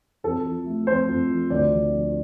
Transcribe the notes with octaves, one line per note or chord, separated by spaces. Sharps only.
F2 A4
F3
A3
F2 C5
F2
F3
D2 D5
D3
F3